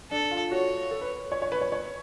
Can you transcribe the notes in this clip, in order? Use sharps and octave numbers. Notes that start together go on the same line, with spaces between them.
D4 A4
F4
F#4 C#5
A4
B4
C#5
C#5
B4
C#5
C#5